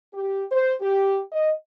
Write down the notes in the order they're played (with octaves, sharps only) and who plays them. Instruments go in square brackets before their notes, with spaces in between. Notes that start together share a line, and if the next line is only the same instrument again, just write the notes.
[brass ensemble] G4
C5
G4
D#5